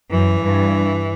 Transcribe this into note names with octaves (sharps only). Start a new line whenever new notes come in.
F#2 E3
G2